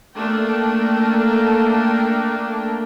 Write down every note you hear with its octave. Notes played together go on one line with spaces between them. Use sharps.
A3 A#3 D4 G5